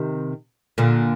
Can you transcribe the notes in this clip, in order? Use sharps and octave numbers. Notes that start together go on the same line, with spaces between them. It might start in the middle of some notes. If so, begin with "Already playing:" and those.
Already playing: C3 D#3
A#2 D3